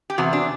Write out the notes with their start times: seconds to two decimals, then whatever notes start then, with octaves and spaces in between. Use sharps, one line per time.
0.10 G4
0.18 E2 C3 F#4
0.33 D4